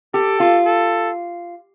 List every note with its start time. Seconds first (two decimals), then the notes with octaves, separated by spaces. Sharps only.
0.14 G4 A4
0.40 F4
0.65 A4